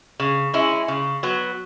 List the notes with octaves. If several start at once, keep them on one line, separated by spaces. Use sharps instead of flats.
C#3
G#3 C#4 E4
C#3
F#3 B3